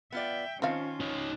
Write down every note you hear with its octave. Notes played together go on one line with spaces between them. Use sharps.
B3 F4 D5 E5 G5
D#3 F3 C4 C#4 F4 F5
D#4 C#5